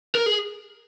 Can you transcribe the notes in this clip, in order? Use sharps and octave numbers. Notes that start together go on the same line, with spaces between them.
A#4
G#4